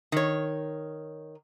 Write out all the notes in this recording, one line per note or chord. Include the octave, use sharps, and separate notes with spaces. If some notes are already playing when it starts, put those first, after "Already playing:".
D#3 C#5